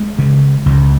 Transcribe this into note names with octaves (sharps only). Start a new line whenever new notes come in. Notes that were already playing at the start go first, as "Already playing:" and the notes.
Already playing: G#3
C#3
C#2